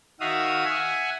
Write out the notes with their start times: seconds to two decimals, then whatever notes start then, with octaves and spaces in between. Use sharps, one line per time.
0.20 D#3 F#4 E5 F5 D#6
0.65 E5 F#5 G#5